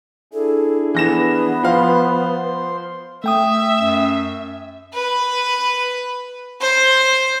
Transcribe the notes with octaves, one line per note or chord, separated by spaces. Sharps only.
D4 E4 G#4 A4
E3 B3 B4 A#6 E7
F3 C5 F5 C6
A3 E5 G5 D#6
F#2
B4
C5